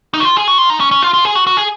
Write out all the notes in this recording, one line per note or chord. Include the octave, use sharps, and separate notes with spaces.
D#4
F#4
F4
G#4
F#4
F4
D#4
C#4
C#4
F4
F4
G#4
F#4
F#4
G#4